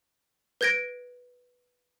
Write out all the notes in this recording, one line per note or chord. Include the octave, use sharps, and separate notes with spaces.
B4 G6 G#6 A#6 D7